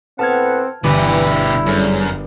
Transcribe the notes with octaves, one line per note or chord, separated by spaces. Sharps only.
A2 B3 C4 F#5 A5 F6 G#6
G1 B2 E3 E4 G4 B4 D6
F#2 A2 C#3 G3